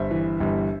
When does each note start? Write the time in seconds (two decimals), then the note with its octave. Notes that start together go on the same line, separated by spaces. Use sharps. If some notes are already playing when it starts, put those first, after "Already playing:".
Already playing: G1 C5 E5
0.11 E3
0.40 G1